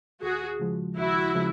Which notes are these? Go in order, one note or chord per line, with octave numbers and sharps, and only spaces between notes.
D#2 F#4 G#4
C#3 F3 G#3
D#2 E4 F#4
C#3 F3 G#3